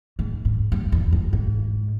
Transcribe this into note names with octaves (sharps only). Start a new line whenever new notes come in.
G#2
G#2
G2
E2
G2
G#2